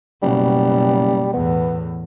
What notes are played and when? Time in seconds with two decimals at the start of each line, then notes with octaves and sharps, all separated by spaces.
0.23 F#1 B2 G3
1.34 E2 A2 B3